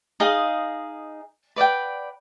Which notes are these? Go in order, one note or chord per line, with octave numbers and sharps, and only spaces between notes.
D#4 G#4 D#5 F5
B4 D5 F#5 G5